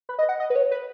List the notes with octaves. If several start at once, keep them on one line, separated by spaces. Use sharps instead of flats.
B4
D#5
F#5
D#5
B4
C#5
B4